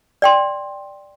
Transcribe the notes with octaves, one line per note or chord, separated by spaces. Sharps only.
D5 G5 C6